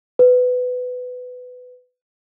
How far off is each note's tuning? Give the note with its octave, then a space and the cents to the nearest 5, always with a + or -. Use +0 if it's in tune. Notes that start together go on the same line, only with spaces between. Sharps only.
B4 +15